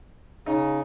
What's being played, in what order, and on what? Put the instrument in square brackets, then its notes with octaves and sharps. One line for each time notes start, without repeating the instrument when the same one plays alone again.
[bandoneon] C#3 [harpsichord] D#4